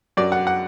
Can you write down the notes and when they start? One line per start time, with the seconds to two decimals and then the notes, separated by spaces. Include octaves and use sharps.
0.17 F#2 F#3 D5
0.32 F#5
0.47 F#5